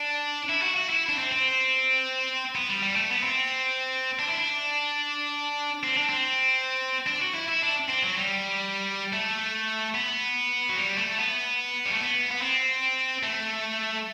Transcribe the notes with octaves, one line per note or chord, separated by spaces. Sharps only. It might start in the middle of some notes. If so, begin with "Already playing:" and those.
Already playing: D4
E4
F#4
F#4
E4
D4
C4
C4
B3
G3
G3
A3
B3
C4
D4
E4
D4
C4
D4
C4
D4
F#4
E4
E4
D4
C4
F#3
G3
A3
B3
F#3
G3
A3
B3
G3
A3
B3
B3
C4
A3